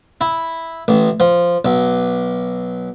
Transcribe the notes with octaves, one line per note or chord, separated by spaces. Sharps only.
E4
A1
F3
B1